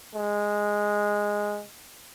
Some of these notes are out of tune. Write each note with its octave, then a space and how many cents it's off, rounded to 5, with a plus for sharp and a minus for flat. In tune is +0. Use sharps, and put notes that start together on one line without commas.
G#3 -5